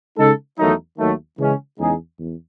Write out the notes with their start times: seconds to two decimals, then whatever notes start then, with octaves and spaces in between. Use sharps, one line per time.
0.18 C#3 G#3 D#4 A4
0.58 E2 D#3 F#3 A3 D#4
0.98 D#2 D#3 F#3 A3
1.38 C#3 E3 G#3 C#4
1.79 E2 C#3 G#3 D#4 G#4
2.19 E2